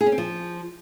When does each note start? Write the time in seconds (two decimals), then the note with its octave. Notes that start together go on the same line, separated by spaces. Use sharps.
0.01 G#4
0.06 C#4
0.12 C4
0.18 F3